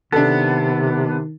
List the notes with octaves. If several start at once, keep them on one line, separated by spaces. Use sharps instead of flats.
C3 D#3 B3 D4 A4